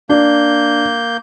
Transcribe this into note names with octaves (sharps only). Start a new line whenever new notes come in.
A#3 D4 G6